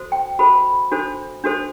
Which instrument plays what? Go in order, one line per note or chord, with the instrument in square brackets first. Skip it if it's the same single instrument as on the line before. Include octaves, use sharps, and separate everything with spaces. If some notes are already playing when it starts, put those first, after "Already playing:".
Already playing: [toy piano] F#4 A4 C5
G5
F#4 A4 C5 B5
D4 F#4 A4 C5
D4 F#4 A4 C5